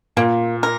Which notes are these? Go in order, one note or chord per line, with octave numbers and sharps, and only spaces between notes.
A#2 A#3
A#4